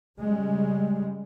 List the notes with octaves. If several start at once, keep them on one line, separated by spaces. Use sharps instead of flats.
C#3 G3 G#3